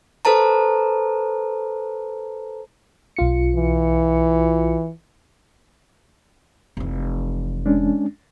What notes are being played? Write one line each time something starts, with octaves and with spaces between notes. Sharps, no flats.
A4 B4 C5 A5 A#5
B1 F4 C#7
E3
F1 E3
G#3 C#4 D4